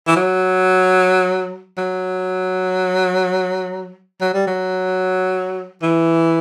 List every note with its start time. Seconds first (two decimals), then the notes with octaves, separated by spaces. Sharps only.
0.07 E3
0.16 F#3
1.78 F#3
4.21 F#3
4.34 G3
4.47 F#3
5.82 E3